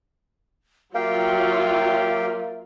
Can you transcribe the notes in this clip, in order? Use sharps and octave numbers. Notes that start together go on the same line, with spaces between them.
F#3 A#3 F4 G4 E5 F5 G5